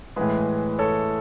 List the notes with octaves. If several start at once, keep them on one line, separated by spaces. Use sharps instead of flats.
A2 E3 G#3 G#4 B4
A4 C#5